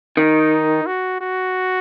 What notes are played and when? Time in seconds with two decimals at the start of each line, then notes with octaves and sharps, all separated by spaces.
0.17 D#3 D#4
0.86 F#4
1.21 F#4